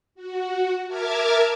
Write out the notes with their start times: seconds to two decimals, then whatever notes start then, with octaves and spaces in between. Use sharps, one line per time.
0.15 F#4
0.88 A#4 E5 A5 D6 F6 G#6